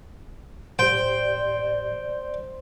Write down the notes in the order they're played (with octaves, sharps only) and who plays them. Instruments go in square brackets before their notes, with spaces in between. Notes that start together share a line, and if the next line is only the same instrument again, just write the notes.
[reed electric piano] A2 G4 [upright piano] C5 [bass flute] D5 [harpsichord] G5